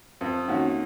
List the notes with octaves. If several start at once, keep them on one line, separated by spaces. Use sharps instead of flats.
F2
D#3 A#3 C#4 F#4